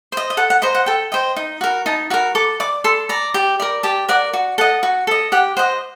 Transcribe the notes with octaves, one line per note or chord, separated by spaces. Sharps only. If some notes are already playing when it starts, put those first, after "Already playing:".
C5 D#5
D#5
A4 F#5
F#5
C5 D#5 A#5
F#5
A4 G5
C5 D#5 G5
D#4
F#4 A#4
D#4 A5
F#4 A#4 A#5
A4 D6
D5 D6
A4 C6
D5 A#5
G4
A#4 D5
G4 A5
A#4 D5 F#5
F#4
A4 D#5 F#5
F#4
A4 D#5
G4 F#5
C5 D#5 F#5